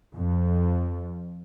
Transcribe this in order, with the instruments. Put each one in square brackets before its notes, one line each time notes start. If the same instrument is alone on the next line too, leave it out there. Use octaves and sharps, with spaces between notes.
[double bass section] F2